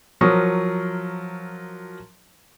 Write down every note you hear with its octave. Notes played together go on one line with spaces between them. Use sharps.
F3 F#3 A#4 C#6 D#6